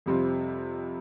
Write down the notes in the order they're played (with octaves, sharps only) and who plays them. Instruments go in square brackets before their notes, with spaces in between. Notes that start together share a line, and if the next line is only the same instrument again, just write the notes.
[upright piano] F2 C3 G3 C4 F4